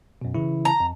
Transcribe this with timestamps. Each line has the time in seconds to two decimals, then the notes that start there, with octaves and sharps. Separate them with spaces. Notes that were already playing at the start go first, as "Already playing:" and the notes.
0.21 F#2 B2
0.35 C#3 E3 E4
0.65 A#5
0.80 F2